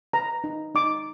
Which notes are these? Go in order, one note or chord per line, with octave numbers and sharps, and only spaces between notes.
B4 A#5
D#4
D#4 D6